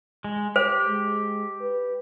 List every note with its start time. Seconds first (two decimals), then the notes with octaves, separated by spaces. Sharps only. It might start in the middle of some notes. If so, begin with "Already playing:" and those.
0.24 G#3
0.56 G4 C5
0.87 G#3
1.61 B4